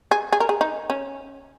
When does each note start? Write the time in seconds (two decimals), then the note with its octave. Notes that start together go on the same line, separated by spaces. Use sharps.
0.11 G#4
0.32 G#4
0.40 A#4
0.49 G#4
0.61 D#4
0.90 C#4